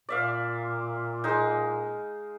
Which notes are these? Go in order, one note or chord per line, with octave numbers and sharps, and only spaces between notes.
A#2 D5 E5 F5
G#3 D#4